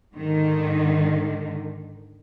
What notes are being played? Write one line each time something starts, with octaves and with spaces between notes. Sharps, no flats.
G#2 D3 D#3